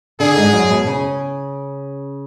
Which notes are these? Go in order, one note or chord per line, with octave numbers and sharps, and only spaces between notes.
D3 D4 G#4
G#2 G#3
F#2 F#3
B2 B3
C#3 C#4